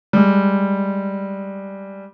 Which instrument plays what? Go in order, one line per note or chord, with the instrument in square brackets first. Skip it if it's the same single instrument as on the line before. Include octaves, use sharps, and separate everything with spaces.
[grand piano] G3 G#3